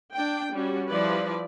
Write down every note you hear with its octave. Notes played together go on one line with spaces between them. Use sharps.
D4 G5
G3 C#4 F#4
F3 G3 E4 B4 D5